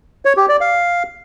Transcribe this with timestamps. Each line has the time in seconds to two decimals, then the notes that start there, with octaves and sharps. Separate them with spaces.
0.25 C#5
0.37 G4
0.49 D5
0.61 F5